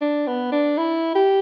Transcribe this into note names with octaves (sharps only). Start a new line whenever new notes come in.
D4
B3
D4
E4
G4